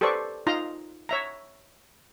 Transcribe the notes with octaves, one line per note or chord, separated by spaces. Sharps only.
G4 A4 B4 C5 D5 C#6
D#4 F4 A#5 C6
C#5 E5 A#5